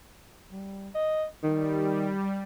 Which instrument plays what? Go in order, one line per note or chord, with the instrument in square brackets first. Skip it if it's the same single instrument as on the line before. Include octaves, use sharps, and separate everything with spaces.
[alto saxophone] G3
D#5
[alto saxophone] D#3 [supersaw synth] G3